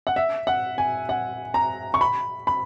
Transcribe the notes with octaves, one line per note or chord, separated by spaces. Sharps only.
F#5
E5
F#5
G#5
F#5
A#5
C#6
B5
B5